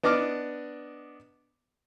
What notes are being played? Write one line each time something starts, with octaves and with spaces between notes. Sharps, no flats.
B3 D4 D#5 D6 F6